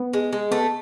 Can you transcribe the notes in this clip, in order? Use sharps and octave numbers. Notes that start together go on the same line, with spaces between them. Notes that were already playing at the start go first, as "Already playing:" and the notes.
Already playing: B3
G#3
G#3
A3 B3